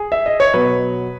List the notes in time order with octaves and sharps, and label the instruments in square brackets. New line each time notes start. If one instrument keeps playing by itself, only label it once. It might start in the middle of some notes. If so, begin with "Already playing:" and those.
Already playing: [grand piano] G#4
E5
D#5
C#5
B2 F#3 B4